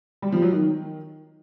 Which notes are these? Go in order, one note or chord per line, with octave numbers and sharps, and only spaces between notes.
G3
F3
F#3
D#3